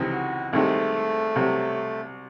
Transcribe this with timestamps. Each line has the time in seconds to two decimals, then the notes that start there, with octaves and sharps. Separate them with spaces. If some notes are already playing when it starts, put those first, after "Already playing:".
Already playing: C#2 C3 E3 C4 D#4
0.12 F#4
0.53 C2 C3 D#3 G#3 A3
1.35 C2 C3 F#3